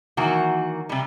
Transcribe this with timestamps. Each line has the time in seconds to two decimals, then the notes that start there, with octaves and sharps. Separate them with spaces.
0.17 D#3 E3 F#3 A#3 F#4
0.89 C3 G3